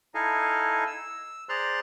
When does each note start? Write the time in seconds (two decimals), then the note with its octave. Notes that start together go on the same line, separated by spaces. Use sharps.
0.15 D#4 E4 A4 D#5 F5 G#5
0.87 E6
1.49 G#4 C5 D5 A#5 C6 F#6